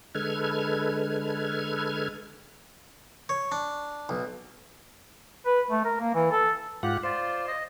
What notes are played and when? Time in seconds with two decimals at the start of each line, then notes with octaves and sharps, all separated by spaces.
0.15 D3 G#3 A4 B4 F6 G#6
3.29 C#5
3.52 D4
4.09 B1
5.46 B4
5.70 A3
5.85 A#4
6.00 A#3
6.14 E3
6.32 A4
6.83 G#2 F4 G4 F#5
7.03 F4 C5 D5
7.48 D#5